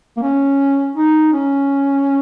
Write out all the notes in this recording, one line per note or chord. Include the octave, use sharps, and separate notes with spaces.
A#3
C#4
D#4
C#4